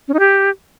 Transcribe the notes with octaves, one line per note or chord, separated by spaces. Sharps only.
C#4
D#4
G4